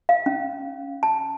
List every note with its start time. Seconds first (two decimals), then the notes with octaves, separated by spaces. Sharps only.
0.09 F5
0.26 C#4
1.03 A5